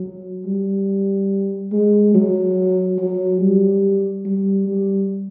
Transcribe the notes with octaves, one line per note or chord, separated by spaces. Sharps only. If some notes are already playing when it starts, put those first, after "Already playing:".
Already playing: F#3
G3
G#3
F#3
F#3
G3
G3
G3